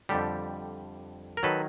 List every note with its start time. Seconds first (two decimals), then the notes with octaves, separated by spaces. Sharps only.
0.09 F2 D3 G3 G4 A4
1.37 A#4
1.43 D#3 F#3 A4 B4